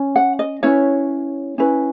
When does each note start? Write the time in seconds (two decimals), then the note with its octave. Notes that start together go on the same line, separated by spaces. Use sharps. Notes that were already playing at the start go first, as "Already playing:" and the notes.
Already playing: C#4
0.16 F#5
0.39 D#5
0.63 C#4 E4 B4 C#5
1.58 C#4 E4 B4